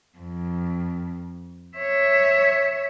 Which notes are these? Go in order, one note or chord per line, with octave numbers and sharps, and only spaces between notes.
F2
C#5 E5